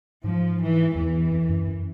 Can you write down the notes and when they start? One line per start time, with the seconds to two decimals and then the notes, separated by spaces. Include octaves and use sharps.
0.24 G#2 F3
0.60 E3
0.95 E2 E3
1.32 F2
1.49 F#2
1.67 F#2